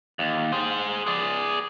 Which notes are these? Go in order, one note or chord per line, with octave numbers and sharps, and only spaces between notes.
D#2
G#4 C5
G#4 D5